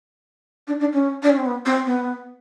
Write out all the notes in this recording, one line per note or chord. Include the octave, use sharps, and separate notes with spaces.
D4
D4
C#4
D4
C#4
C4
B3
C4
B3